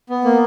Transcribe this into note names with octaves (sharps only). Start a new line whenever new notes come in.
B3
A#3